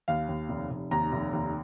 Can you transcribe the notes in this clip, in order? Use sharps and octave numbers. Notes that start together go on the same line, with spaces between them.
D#2 F5
D#2
F1
F1
D#2 A#5
F1
D#2